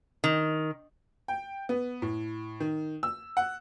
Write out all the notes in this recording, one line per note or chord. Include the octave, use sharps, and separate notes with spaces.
D#3
G5
B3
A2
D#3
E6
F#5